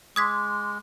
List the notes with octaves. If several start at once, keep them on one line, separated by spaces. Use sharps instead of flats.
G#3 C6 D6 D#6 G#6 B6